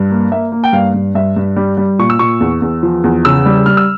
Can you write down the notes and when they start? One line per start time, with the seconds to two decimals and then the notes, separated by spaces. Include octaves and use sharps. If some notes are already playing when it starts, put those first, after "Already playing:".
Already playing: G2
0.11 A#3
0.32 A#3 E5
0.52 A#3
0.64 G5
0.73 G2 F5
0.94 G2
1.15 G2 E5
1.36 G2
1.56 G3
1.77 G3
1.99 A#2 C#6
2.10 E6
2.19 A#2 C#6
2.40 E2
2.62 E2
2.83 F3
3.04 E2
3.25 C#3 E6
3.46 G3
3.66 G3 F6
3.77 E6